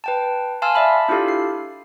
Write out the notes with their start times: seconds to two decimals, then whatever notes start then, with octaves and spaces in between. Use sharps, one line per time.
0.04 B4 G5 A5
0.62 F5 G#5 A5 C6 E6 F6
0.75 D5 E5 A5 B5
1.08 D4 E4 F4 G4 A4 F5
1.28 C7